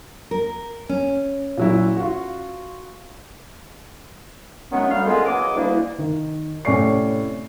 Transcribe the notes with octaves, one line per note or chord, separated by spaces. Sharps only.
A#4
C#4
A#2 F#3 E4
F4 F#4
D#3 F#3 G#3 A3 B3 C#4
D2 G3 F5
G#3 A#3 B3 C#4 F4 A4
E2 F#3 D#5 D6
D2 E3 G3 A#3 D4 E4
D#3
A2 C3 C#4 D5 C#6 C7